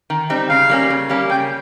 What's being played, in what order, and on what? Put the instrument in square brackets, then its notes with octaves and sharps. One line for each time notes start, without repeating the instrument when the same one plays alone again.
[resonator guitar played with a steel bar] D#3
G3 C4 D#4
[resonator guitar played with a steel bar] C#3 [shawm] F5
[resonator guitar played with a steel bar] G3 A#3 C#4
C#3
G3 A#3 C#4
[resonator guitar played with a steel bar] C#3 [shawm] G5